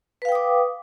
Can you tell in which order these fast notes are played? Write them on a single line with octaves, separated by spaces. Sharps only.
B4 F5 G5 D#6 D6